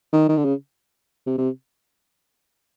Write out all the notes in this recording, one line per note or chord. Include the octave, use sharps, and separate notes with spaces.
D#3
D#3
D3
C#3
C3
C3